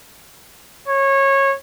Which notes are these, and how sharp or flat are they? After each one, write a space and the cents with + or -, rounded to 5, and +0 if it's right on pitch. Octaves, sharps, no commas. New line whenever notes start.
C#5 -20